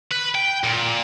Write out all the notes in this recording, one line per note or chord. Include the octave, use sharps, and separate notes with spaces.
B4
G5
A#2